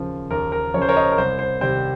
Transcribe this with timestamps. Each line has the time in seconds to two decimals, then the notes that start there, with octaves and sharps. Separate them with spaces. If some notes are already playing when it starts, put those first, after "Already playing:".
Already playing: D#2 C#3 F3
0.31 D#2 A#4
0.52 A#4
0.74 F3 C#5
0.77 C#3 C5
0.89 A#4 C#5
0.96 C5 D#5
1.12 A#4
1.18 C2 C5
1.39 C5
1.61 C3 D#3 G3 C4 C5